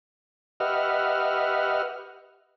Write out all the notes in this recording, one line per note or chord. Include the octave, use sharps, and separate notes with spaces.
G4 B4 D#5 E5 F#5 F6